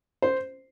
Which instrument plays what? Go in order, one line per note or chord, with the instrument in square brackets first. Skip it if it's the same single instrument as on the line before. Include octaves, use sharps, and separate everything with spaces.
[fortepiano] C5